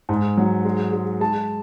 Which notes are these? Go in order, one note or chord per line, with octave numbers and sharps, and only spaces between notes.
G#2
F#3
G#3
G#3
G#3 A5